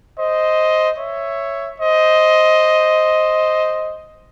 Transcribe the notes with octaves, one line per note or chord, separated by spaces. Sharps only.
C5 D#5
C#5 E5
C5 D#5